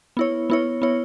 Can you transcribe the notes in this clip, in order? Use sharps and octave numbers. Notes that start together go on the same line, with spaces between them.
B3 E4 C#5
B3 E4 C#5
B3 E4 C#5